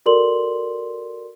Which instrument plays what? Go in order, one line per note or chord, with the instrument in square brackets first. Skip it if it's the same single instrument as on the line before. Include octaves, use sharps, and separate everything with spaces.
[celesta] F#4 A4 A#4 D5 C6 F#7